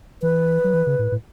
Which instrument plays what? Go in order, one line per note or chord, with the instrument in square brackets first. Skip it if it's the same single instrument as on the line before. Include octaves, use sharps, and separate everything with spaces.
[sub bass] E3 [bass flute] B4
[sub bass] F#3
E3
C#3
A2
A2